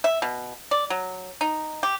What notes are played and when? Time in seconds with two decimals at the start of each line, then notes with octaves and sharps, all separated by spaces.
0.04 E5
0.22 B2
0.71 D5
0.90 F#3
1.41 D#4
1.83 G4